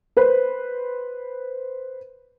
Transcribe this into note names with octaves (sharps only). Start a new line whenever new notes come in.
B4 C5